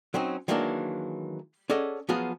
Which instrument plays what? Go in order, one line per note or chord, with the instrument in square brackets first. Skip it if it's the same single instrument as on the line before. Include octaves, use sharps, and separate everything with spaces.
[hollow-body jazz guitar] F#3 C4 C#4 D#4
D#3 E3 F#3 G#3 A#3 D4
C#4 G#4 A4 D5 D#5 F#5
F3 F#3 B3 F4 F#4 G#4